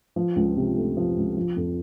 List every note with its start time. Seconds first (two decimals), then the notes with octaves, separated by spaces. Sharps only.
0.16 F3
0.36 C#2
0.56 C3
0.76 A3
0.97 F3
1.17 C#2
1.37 F3
1.56 F2